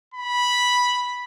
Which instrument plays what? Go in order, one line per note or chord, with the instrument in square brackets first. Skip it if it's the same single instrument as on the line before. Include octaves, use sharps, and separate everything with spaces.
[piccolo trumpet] B5